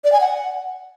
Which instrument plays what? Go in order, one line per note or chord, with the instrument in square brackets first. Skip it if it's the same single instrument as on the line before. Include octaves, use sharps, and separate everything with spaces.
[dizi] D5
G#5
F#5